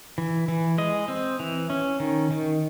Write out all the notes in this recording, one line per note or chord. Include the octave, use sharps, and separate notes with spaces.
E3
E3
G#3 D#5
C4
E3
C#4
D#3
D#3